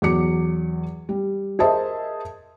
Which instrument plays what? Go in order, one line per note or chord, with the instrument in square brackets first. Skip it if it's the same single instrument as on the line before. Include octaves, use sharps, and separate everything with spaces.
[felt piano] E2 F#3 D6 C#7
G3
G#4 A#4 C5 D#5 E5 A5